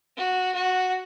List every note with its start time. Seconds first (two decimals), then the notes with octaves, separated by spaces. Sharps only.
0.17 F#4
0.54 F#4